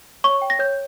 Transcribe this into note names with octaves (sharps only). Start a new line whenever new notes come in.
C#5 C#6
G5
A#6
C#5 G6